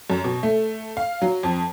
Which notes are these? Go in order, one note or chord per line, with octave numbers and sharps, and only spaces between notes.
F#2
B2
A3
F5
F#3
F2